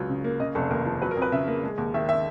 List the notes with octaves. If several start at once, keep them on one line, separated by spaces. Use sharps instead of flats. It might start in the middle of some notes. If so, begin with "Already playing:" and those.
Already playing: C#2 F#3
C#3
A#3
C#3 D#5
F1 A4
D#2 A#4
F3
F#3 B4
A#4
F2 B4
C#3 E5
A#3
G#3
D#2
D#3 E5
E5